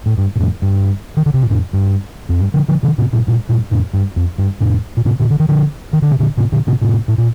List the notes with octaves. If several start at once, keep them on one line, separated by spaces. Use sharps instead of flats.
A2
G2
A#2
F2 A2
G2
D#3
D3
C3
A#2
F2 A2
G2
F2
G2
D3 F3
D3 F3
C3 D#3
A2 C3
G2 A#2
G2 A#2
G2 A#2
F2 A2
G2
F2
G2
F2 A2
A#2
A2 C3
A#2 D3
D3
D#3
D3 F3
D#3
D3
C3
A#2 D3
A2 C3
A#2 D3
A2 C3
A2 C3
A2
A#2